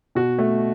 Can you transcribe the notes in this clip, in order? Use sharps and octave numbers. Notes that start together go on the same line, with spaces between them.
B2 F#4
A3